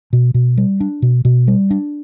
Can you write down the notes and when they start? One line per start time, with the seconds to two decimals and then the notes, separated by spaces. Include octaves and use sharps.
0.13 B2
0.34 B2
0.57 G3
0.80 D4
1.02 B2
1.25 B2
1.47 G3
1.70 D4